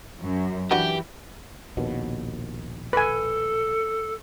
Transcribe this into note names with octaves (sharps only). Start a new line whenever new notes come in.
F#2
E3 D4 F#4 G4 B4
A#1 D#2 B2
A4 B4 G#5